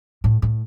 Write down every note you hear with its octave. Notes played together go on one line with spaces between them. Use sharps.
A2
A2